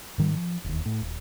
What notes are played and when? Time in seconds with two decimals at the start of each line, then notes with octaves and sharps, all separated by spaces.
0.18 G#2 D#3 G3
0.34 F3
0.64 E1 D#2
0.85 A2
1.01 D#1